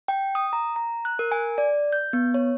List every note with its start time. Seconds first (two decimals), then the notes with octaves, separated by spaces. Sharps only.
0.08 G5
0.35 D#6
0.53 A#5
0.76 A#5
1.05 F#6
1.19 A#4
1.32 G#5
1.58 D5
1.93 G6
2.13 B3
2.34 C#5